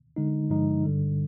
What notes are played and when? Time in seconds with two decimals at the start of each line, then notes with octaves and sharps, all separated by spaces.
0.16 D3 G#3 D#4
0.50 G2 D3 F3 G#3 D#4
0.84 G2 D3 G3